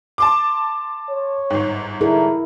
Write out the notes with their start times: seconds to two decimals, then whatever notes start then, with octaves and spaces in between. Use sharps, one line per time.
0.18 A5 C6 D6
1.09 C#5
1.50 G1 G#2
2.01 D3 E4 G#4 A#4